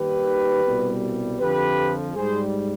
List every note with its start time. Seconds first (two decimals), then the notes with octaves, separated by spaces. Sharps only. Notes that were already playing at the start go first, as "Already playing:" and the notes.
Already playing: D#2 D#3 G3 G4 B4
0.64 C2 B2 G3
1.40 F2 D3 F3 G4 B4
2.15 G#2 G3 G#4 C5